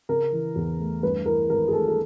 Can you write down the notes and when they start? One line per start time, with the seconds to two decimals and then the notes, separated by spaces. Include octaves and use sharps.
0.09 C#3 A#4
0.32 E3
0.56 E2
0.79 A3
1.03 G2 B4
1.26 E3 A#4
1.50 G#1 A#4
1.68 G#4
1.73 A3 A4
1.88 A4